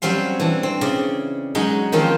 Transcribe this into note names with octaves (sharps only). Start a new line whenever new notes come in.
F#3 G3 C4 C#4 F5
E3 D4
C4
C#3 D5
F#3 G#3 C#4 D#4
D#3 F3 A#3 C4 C#4 F4